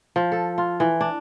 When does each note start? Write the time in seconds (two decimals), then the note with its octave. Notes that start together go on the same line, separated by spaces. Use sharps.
0.16 F3
0.32 A4
0.58 F4
0.80 E3
1.01 D4